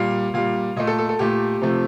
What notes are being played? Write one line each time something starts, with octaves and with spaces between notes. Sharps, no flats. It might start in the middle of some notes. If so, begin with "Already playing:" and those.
Already playing: A#2 G3 F5
A#2 G3 F5
A#2 A3 D#5
A4
A4
A4
A#2 A3 G4
C3 F3 A3